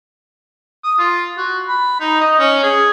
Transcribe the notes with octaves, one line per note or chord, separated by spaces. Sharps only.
D#6
F4
F#4
B5
D#4
D#5
C#4
G#4